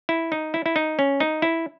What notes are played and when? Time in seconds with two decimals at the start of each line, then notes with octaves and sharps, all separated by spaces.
0.09 E4
0.32 D#4
0.54 E4
0.66 E4
0.76 D#4
0.99 C#4
1.20 D#4
1.42 E4